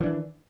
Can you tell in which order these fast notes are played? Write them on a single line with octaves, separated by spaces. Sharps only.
E3 D4 D#3